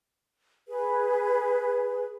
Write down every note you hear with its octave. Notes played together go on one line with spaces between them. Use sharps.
G#4 B4